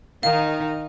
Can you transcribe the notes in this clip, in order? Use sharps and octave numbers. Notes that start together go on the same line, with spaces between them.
D#3 D#4 F5